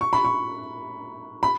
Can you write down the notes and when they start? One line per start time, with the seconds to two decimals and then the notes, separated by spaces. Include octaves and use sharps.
0.01 C#6
0.13 B5
0.25 C#6
1.43 B5